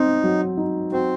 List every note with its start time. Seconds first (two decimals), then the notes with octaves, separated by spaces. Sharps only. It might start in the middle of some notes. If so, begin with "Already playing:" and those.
Already playing: C4 D#4
0.23 F#3
0.57 D#4
0.92 C4 F#4